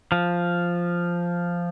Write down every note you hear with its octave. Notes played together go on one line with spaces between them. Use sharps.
F3